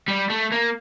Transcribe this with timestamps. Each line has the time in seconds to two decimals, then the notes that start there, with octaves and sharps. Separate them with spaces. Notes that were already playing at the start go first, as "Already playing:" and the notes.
0.08 G3
0.30 A3
0.52 A#3